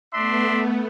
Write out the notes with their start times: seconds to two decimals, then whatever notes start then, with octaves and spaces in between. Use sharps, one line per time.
0.14 A3 B3 D4 E5 C6